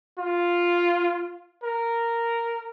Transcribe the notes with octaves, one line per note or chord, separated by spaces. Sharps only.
F4
A#4